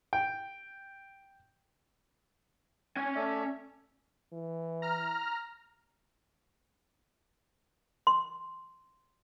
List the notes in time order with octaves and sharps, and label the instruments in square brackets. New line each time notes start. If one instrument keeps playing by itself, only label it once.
[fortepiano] G5
[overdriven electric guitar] C#4 G#5
[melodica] A3 D5 E5
[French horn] E3
[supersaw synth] A#5 F6
[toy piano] C6